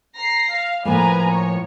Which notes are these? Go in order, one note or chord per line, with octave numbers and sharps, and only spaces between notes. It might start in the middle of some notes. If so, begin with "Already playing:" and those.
A#5 A#6 C7
F5
A2 F3 A#3 B4 G#5 A#5
C#5